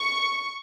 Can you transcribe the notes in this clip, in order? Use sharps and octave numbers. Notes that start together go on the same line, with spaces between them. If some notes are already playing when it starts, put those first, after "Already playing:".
Already playing: C#6